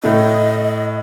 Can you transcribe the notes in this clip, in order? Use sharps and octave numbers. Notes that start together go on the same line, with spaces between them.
A2 A3 D#5